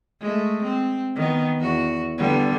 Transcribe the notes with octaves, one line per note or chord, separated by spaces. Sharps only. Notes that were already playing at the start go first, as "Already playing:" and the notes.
G#3 A3
C4
D#3 B3
E2 F#4
D3 G3 B3